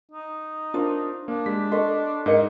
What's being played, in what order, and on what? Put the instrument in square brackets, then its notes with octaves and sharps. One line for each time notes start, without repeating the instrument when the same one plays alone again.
[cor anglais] D#4
[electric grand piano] D4 A#4 C5 [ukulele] F4
[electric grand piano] A#3 [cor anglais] D4
[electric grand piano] G#3 G4 B6
[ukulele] A4 D#5 [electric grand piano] C6 C#6
[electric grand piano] G#2 C#7 [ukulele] D#4 A#4 D#5